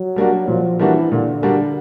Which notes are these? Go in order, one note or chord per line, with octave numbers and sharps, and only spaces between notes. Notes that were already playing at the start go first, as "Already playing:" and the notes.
Already playing: F#3
G3 A#3 D4 F#4
A#2 F3
E3 G3 A#3 D4 F#4
A#2 D3
G3 A#3 D4 F#4